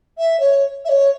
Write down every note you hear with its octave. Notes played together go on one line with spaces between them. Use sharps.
E5
C#5
E5
C#5